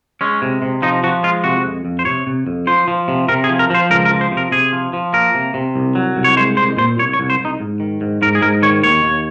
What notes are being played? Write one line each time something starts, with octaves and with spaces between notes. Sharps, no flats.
G#3 C#4
C3
C3
F3 D#4
F3 F#4
G#3 F4
C3 F#4
F2
F2
C5
C3 C#5
C3
F2
F3 C5
F3
C3
C3 A#4
G#4
F3
A#4
F3 C5
C#2 A#4
A#4
F3
C5
C3
A#4
C3 G#4
F3
F3
A#3 A#4
C3
C3
C2
F#3
C2
C#5
G#3 C5
C2 C5
A#2 C5
C2 C#5
C#5
C2
C5
C2
D#4
G#2
D#3
G#2
G#2 A#4
G#4
G#2 A#4
D#3 C#5
D#2 C#5
D#2